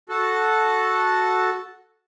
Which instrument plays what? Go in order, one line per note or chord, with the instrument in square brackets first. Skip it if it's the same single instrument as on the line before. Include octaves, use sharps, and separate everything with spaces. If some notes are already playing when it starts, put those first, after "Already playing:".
[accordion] F#4 A4